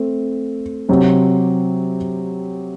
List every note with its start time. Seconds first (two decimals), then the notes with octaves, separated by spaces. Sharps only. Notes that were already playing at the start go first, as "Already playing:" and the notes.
Already playing: A3 C4
0.89 C3 F#3 C4 G4